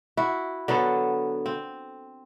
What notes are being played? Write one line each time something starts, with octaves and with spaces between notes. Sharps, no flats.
E4 F#4
D3 F#3 B3 A4
C4